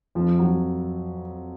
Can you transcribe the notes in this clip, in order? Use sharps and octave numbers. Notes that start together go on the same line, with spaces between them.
F2 F3
F#3
F2 F3